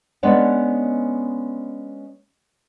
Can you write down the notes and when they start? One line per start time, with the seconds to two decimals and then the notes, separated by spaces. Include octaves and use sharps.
0.23 G#3 B3 C#4 D4 B4 C#5